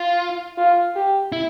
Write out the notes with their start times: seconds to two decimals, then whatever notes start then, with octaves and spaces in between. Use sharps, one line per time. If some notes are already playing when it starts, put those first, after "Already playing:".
Already playing: F4
0.58 F4
0.96 G4
1.32 E4